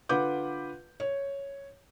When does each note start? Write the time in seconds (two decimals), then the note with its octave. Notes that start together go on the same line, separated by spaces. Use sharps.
0.09 D3 F4 B4 F#5 D6 G6
1.00 C#5